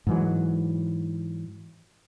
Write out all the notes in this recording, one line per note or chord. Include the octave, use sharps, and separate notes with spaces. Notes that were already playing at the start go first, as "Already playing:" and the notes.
G#2 E3 F#3